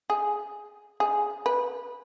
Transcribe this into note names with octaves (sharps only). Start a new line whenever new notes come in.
G#4
G#4
B4